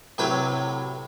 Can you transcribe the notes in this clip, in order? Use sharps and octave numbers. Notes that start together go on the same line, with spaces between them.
A2 C3 F#3 B4 G5 G#5